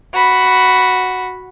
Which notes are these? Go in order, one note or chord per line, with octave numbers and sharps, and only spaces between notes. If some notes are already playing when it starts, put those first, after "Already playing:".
F#4 B5